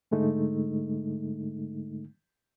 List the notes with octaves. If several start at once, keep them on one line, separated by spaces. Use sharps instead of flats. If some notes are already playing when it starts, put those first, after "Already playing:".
G#2 D3 G#3 A3 D#4